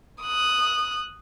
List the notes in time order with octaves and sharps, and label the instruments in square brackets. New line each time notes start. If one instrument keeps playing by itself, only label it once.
[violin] D#6 F#6